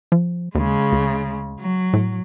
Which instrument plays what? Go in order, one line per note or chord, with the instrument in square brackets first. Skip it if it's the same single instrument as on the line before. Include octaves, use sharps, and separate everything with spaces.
[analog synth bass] F3
[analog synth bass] D#2 [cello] C#3 G#3
[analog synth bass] D2
[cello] F#3
[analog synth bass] A2